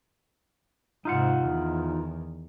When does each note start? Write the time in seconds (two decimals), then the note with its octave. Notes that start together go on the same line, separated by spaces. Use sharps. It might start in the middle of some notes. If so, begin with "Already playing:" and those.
1.05 G#2 C3 D#4 F4 F#5
1.45 E2 D#3